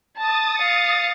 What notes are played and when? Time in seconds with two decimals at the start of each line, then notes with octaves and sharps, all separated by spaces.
0.17 A5 D#6 A6
0.59 F5 C#7